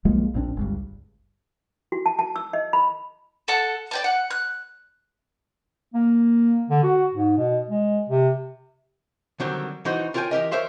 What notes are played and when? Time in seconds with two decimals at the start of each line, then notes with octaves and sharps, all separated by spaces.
0.05 B1 F3 G#3 A#3
0.34 A#1 A#2 C4 D4
0.57 G1 C#2 G2
1.92 F#4
2.06 A5
2.19 A5
2.36 E6
2.53 D#5
2.73 B5
3.48 A4 F#5 A5
3.91 D5 G5 A5
4.04 F#5
4.31 F#6
5.94 A#3
6.70 D3
6.83 F#4
7.14 G#2
7.38 B2
7.70 G#3
8.09 C3
9.40 D3 D#3 F#3 G3 C4
9.85 E3 D#4 F#4 C5
10.14 F4 A#4 C#5 F5 G5 G#5
10.31 E3 G4 A#4 D#5
10.51 A#4 C5 C#5 E5 F5 C6